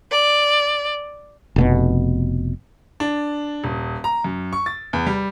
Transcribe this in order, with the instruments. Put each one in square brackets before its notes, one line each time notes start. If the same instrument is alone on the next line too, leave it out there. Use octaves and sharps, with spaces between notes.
[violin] D5
[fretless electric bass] F1 B2 B3
[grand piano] D4
D#1
A#5
F#2
C#6
A6
E2
G3